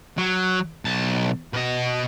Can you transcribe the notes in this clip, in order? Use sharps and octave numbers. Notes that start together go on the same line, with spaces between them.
F#3
B1 A5
B2 D#5